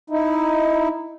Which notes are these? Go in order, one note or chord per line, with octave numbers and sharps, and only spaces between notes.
D#4 E4